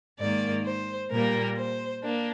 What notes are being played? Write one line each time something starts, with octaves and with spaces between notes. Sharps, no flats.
G#2 D#3 A#3 D5
C5
A#2 G3 A#3 A#4
C5
A#3 D4